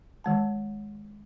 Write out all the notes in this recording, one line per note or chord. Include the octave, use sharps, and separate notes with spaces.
D#3 G#3 A5